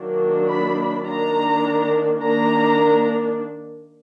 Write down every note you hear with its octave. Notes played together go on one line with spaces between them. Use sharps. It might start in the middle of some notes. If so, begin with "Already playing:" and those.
Already playing: D#3 F#3 A#3 D4
B5
D#3 A#3 D4 A#5
D#3 A#3 D4 A#5